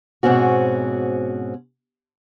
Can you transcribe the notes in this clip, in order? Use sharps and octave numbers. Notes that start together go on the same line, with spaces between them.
G#2 B2 C4 C#4 F#4